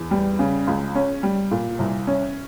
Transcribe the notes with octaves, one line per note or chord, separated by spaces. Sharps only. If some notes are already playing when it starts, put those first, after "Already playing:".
Already playing: E2
G3
C#3
C#2
C#4
G3
A#2
C2
C#4